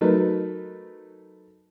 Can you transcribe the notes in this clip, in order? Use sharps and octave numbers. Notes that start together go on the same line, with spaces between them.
F#3 A3 D#4 A#4 B4